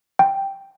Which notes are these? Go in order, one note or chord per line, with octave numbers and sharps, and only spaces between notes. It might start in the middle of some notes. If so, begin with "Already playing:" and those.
G5